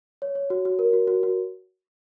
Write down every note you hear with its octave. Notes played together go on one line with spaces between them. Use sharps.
C#5
C#5
F#4
F#4
A#4
F#4
F#4
F#4